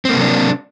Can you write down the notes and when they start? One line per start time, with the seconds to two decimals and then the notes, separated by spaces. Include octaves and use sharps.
0.05 C4
0.09 A#3
0.13 C3
0.17 F#3
0.22 D4